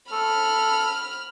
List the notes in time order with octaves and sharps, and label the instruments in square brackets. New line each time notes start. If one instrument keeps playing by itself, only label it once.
[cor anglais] A4 [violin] B5 F6